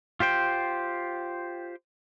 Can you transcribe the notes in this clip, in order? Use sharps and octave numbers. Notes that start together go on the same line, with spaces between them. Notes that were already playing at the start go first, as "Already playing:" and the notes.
F4 G4 C5 G5